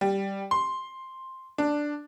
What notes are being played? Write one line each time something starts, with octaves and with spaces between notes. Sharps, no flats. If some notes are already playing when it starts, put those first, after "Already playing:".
G3
C6
D4